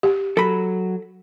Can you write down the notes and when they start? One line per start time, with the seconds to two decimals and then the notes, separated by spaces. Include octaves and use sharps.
0.03 G4
0.37 F#3 A4 B5